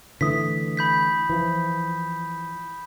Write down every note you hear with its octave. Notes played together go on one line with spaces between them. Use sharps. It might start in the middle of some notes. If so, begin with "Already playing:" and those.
D3 E3 A3 D#6 B6
B5 G6 B6
E3 F3